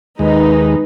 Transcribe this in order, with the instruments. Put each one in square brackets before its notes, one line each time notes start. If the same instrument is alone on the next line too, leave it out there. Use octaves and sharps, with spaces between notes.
[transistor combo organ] D#2 G#3 [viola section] D#4 B4